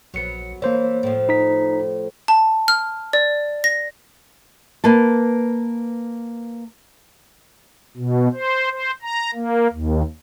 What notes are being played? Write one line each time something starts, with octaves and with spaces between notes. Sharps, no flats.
A#1 F#3 B3 C#7
E3 A#3 C5 C#5
A2 F3
D#4 A#5 B6
A5
F6
D5
A#6
A#3 B4 A5
B2
C5
C5
A#5
A#3
D#2